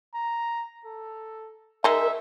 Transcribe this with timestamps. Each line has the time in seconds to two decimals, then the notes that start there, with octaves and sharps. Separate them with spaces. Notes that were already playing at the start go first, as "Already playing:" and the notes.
0.14 A#5
0.85 A4
1.84 G#3 D#4 A#4 E5